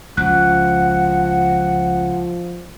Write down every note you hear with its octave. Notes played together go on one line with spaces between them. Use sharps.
C#2 F3 F#5 F#6